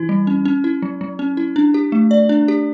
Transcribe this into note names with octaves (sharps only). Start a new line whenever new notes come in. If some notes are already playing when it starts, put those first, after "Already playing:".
Already playing: E3 E4
G3
C#4
C#4
E4
F#3
F#3
C#4
E4
D4
G4
A3
D5
D4
G4